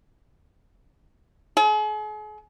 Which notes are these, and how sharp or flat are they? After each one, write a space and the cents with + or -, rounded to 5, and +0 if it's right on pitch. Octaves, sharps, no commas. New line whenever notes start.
G#4 +40